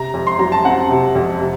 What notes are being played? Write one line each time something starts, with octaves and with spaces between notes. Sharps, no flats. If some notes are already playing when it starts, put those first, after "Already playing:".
Already playing: C3 A#5
F2
C6
F#3 A#5
A5
C4 F#5
C3
F2
C3